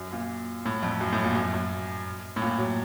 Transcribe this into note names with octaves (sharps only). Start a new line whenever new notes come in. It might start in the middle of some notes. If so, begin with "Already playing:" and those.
Already playing: F#2
A#2
A2
F2
F#2
A2
A#2
F#2
F#2
A2
A#2
F#3